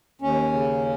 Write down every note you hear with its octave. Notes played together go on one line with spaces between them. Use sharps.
D#2 C#4
C#3